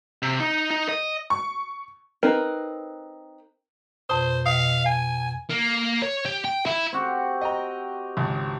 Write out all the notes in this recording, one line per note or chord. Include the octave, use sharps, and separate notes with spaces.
C3
D#4
D#4
D#5
C#6
C4 D#4 A#4 B4
F2 B2 C5
B2 F5
G#5
A#3
C#5
G4
G5
E4
C4 F#4 G4
D#5 G5 A#5
G#1 C#2